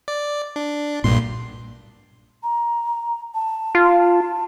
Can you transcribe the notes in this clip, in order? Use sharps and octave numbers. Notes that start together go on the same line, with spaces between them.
D5
D4
B1 G2 A#2 C6
A#5
A5
F4